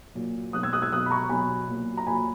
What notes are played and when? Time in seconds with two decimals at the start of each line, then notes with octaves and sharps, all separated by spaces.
0.15 A#2 F#3
0.53 B2 F#3 D#6 F#6
0.63 E6 G#6
0.73 D#6 F#6
0.82 E6 G#6
0.92 B2 F#3 D#6 F#6
1.06 B5
1.10 A#5 C#6
1.29 B2 F#3 G#5 B5
1.68 A#2 F#3
1.97 A#5
2.06 A#2 F#3 G#5 B5